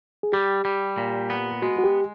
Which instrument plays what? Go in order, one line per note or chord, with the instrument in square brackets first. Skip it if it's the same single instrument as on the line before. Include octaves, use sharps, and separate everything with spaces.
[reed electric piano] G#4
[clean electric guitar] G3 [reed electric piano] G4
[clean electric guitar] G3
A#2
B3
[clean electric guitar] G#3 [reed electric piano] F#4
[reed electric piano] F#4
G4